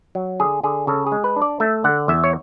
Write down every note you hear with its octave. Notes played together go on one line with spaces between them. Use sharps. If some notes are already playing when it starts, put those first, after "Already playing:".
F#3
D3 G#4
D3 G#4
C#3 A4
G#4
G#3
B4
D4
D5
A3 E5
D3 F#5
E2 E5
C#5